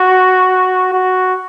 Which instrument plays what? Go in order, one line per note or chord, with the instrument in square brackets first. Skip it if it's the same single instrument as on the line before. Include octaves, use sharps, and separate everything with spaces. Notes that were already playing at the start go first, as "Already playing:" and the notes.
Already playing: [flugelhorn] F#4
F#4